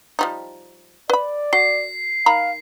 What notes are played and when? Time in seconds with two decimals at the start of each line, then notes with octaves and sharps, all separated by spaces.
0.19 F3 G3 D#4
1.10 B4 D5 B5
1.53 F#4 C7
2.26 D#3 F5 A#5 B5